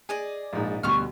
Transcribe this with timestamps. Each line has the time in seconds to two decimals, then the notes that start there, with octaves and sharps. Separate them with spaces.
0.09 G#4 D5 D#5 G#5
0.53 A#1 G#2
0.83 D2 B2 G3 F#4 C#6 F6